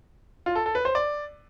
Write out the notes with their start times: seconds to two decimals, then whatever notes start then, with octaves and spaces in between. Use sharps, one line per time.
0.46 F4
0.56 A4
0.66 A4
0.75 B4
0.85 C5
0.95 D5